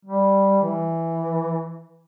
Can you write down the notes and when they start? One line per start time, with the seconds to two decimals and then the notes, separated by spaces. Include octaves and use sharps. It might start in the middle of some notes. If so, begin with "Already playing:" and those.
0.05 G3
0.62 E3